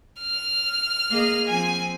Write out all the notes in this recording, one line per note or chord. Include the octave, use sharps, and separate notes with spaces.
F6
A#3 G#4 D#5
F3 C4 G#5